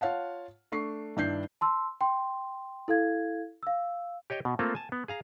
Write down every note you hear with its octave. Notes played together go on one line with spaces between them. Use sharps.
F4 C#5 F5 F#5 A5
A3 D4 C#6 C7
G2 D#3 D4 E4 G6 C7
A5 C6 E6
G5 C6
E4 A4 F5 G#6
F5 E6
G4 C#5 D#5 G5
B2
A3 A#3 C4 F4 A4
G#5 A5
B3
G#4 F5 A#5